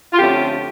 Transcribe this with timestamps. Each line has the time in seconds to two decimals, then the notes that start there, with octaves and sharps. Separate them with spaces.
0.13 F4
0.19 F2 D3 A3 C#4 G4